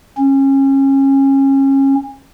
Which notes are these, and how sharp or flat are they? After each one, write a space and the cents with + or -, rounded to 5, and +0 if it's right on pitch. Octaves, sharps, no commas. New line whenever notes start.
C#4 -25